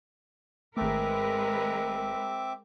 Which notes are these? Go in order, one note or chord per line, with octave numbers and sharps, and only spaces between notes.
G#1 G#3 A3 C4 A#4 B4 E5 D6